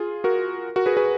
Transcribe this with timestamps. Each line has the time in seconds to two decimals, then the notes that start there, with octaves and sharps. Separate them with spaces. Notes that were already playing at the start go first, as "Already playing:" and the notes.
Already playing: F4 G#4
0.24 F#4 A#4
0.76 F#4 A#4
0.86 G#4 B4
0.97 G#4 B4